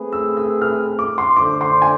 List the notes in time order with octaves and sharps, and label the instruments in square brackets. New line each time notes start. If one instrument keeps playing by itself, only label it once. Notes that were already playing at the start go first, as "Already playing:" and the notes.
Already playing: [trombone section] A3 C4 G#4 B4
[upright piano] E6
E6
F6
D6
C6
[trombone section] D3 A3 D4 A4 C5 [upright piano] D6
[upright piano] C6
G#5